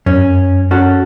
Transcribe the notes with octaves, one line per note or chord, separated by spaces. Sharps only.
F#2 C#4
C#4 F#4 A4